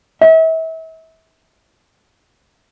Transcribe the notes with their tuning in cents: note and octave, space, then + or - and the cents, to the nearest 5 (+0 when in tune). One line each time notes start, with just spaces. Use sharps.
E5 -35